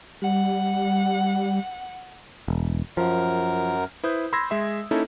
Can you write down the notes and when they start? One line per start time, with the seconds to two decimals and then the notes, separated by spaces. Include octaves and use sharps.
0.22 G3 F#5
2.48 E1
2.97 F#2 F3 A#4
4.04 E4 B4 C5 D#6 G6
4.33 B5 C6 E6 G#6 A#6
4.50 G#3 E5 C6
4.91 A#3 C#4 D#4 E4 A4